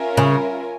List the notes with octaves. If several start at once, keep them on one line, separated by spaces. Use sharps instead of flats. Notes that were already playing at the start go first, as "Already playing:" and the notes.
Already playing: C#4 F4 A#4 E5 G#5
C#3